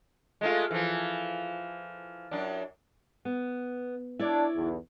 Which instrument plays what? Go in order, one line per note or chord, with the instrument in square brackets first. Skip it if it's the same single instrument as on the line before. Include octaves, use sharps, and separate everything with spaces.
[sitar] G#3 A3 F4
E3 F3
F#2 D4
[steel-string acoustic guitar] B3
[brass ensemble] D4 [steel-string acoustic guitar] E4 C#5 D5
[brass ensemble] B1 E2